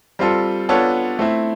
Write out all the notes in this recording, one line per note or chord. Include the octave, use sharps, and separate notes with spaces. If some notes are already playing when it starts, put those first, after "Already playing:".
G3 C4 F4 A4
B3 D4 F4 A4 C#5
A3 C4 E4